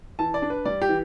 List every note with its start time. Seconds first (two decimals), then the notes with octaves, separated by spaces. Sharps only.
0.19 E3 A5
0.34 D5
0.42 D4
0.50 B4
0.65 G3 D5
0.82 G4
0.89 E3